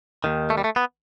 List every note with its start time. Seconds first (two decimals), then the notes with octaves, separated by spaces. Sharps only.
0.24 D#2 D#3
0.50 A3
0.58 G3
0.64 A3
0.76 B3